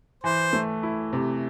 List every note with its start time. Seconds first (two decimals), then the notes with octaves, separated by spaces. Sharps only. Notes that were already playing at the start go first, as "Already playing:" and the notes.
0.24 E3 C5
0.53 A3
0.83 E4
1.13 C3